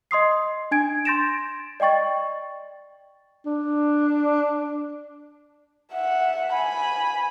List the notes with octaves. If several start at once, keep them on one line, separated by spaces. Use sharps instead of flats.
D#5 C6 D#6 C7
D4 G#5 G#6 D7
C6 G6 A6 A#6 D7 E7
D5 D#5 G5 C#6 A6
D4
E5 F#5
G#5 B5